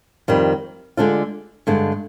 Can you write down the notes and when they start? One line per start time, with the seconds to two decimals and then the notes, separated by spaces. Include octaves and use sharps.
0.28 F2 D#3 G3
0.97 D3 G#3 D4 F4
1.67 G2 D3 G#3